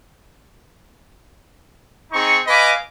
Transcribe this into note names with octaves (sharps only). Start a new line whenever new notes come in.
C4 D#4 G#4 C#6
B4 D#5 F5 G#5 B5 D6